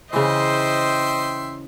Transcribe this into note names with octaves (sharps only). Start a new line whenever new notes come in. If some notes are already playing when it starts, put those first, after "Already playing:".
C#3 E3 C5 D#5 E5 G5 C6